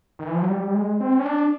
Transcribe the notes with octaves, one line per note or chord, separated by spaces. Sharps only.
D#3
E3
F3
F#3
G3
G3
G#3
C4
C#4
D4